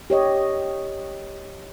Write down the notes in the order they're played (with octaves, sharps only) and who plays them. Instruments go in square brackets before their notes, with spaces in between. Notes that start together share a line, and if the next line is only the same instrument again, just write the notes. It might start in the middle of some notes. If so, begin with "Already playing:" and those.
[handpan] G4 C#5 D#5